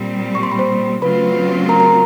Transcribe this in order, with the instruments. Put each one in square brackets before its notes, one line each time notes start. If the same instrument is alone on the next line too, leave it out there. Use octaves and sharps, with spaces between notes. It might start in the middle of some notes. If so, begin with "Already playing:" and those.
Already playing: [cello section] A#2 G3 C4
[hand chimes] C#6
C6
B5
C5 C6
[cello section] C#3 F#3 A3 C4 F4 [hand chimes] B4 B5
[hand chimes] A#4 A#5
A#4 A#5